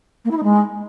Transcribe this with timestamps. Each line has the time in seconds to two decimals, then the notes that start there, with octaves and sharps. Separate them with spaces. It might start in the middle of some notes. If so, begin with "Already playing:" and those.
0.24 A#3
0.30 E4
0.37 D#4
0.43 G#3